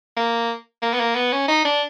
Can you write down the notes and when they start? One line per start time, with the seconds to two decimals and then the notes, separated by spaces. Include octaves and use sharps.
0.17 A#3
0.82 A#3
0.93 B3
1.00 A#3
1.15 B3
1.32 C#4
1.48 D#4
1.65 D4